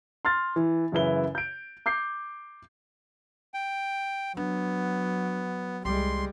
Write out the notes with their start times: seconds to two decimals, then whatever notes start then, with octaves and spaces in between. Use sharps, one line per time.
0.25 C6 F6 A6
0.56 E3
0.92 F#2 C#3 E3 E4 B4 G7
1.35 G6 D7
1.86 D6 G6 C7
3.54 G5
4.37 F#3 B3 D4
5.85 C2 G3 G#3 C6